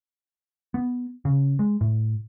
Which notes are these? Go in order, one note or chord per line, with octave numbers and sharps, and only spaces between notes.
B3
C#3
G#3
A2